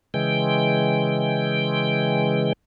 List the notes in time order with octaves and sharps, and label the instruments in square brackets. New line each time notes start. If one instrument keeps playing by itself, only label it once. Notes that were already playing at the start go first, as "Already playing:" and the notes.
[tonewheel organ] C#3 E3 G#3 G5